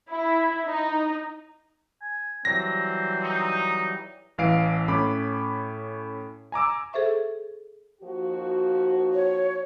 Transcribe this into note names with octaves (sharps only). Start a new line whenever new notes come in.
E4
D#4
G#5
E3 F#3 G3 C4 A#6
D#4
A1 E3 F5 C7 D7
A2 C#4 B5 D6
G#5 A#5 D6 E6
G#4 A4 C5 E5 C#6
D#2 F3 F#4
C#5